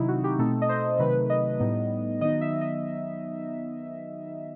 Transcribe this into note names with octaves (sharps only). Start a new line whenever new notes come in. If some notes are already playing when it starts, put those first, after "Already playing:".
Already playing: C3 D#3 F#3 C4 D#4 E4
F#4
G4
B2 A3 C4 D#4 A4
D#5
C5
C3 D#3 F#3 A3 D#4 B4
D#5
A2 G3 B3 D#4
D#3 F#3 B3 D#4 D#5
E5
D#5